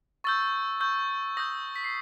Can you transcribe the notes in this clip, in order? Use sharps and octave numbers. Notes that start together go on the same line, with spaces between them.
C#6 E6 G6 A6
C#6 E6 G6
D#6 G6 A#6
B6
C7